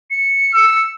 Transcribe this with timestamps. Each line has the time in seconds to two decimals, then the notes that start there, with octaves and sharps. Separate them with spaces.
0.10 C#7
0.54 E6